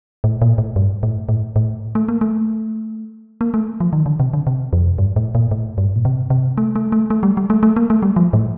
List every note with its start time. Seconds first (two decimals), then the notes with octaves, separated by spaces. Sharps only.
0.24 A2
0.42 A#2
0.58 A2
0.76 G2
1.03 A2
1.29 A2
1.56 A2
1.95 A3
2.08 A#3
2.21 A3
3.41 A#3
3.54 A3
3.80 F3
3.93 D#3
4.06 D3
4.20 C3
4.33 D3
4.47 C3
4.73 F2
4.98 G2
5.16 A2
5.35 A#2
5.51 A2
5.78 G2
5.96 A#2
6.05 C3
6.30 C3
6.58 A3
6.76 A3
6.92 A3
7.10 A3
7.23 G3
7.37 G3
7.50 A3
7.63 A3
7.76 A#3
7.90 A3
8.02 G3
8.16 F3
8.33 A2